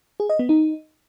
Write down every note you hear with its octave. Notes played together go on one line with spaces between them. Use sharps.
G#4
D#5
B3
D#4